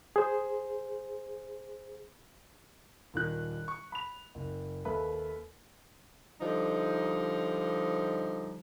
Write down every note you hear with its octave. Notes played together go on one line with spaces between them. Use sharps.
G#4 C5
D#1 D#3 F#6
C#6
B5 F7
F#1
D#2 A4 B4 E5 B5
D3 F3 G3 D#4